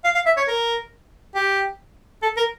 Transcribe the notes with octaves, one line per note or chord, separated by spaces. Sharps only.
F5
F5
E5
C#5
A#4
G4
A4
A#4